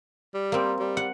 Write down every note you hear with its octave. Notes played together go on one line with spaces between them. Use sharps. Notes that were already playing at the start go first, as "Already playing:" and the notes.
G3
A#3 C4
G3
F#5